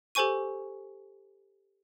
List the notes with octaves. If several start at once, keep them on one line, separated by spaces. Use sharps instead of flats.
G4 A4 C5 G#5 C#6 D#7